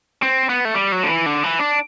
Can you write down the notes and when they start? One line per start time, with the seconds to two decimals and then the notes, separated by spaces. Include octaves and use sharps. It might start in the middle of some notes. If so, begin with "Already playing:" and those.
0.22 C4
0.49 B3
0.65 A3
0.75 G3
0.92 F#3
1.03 D3
1.08 E3
1.26 D3
1.43 E3
1.59 D4